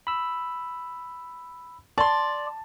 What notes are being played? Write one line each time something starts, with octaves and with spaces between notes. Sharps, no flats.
B5 E6
D5 A5 C6